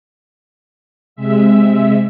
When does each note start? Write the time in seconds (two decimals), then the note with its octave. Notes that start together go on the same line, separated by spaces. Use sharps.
1.16 C3 G#3 E5